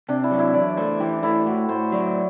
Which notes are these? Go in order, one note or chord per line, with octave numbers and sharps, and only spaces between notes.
C3 D4
E4
F#3
E4
E2 D5
A3 C5
E3 G4
A3 E4
A2 F#4
A2 C5
F#3 D5